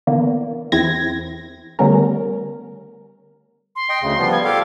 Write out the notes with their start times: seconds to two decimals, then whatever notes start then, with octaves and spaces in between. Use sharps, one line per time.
0.07 D3 E3 A#3 B3
0.72 E2 C4 E4 G#6 A#6
1.79 D3 G3 A3 B3 C#4 A#4
3.76 C6
3.89 D#5 G5
4.02 D2 C#3
4.18 F3 G3 B3
4.32 G#6
4.44 G4 A4 F5 D6